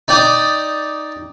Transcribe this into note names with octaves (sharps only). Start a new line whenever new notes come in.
D#4 D5 G5 D6 D#6